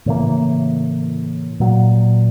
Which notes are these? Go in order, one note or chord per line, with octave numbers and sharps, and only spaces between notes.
A2 C#3 E3 A#3
A#2 F#3